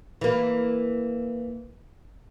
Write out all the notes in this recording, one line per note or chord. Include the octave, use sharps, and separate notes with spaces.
E3 A#3